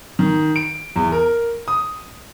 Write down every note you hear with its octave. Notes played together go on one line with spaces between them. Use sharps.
D#3
D7
E2
A#4
D#6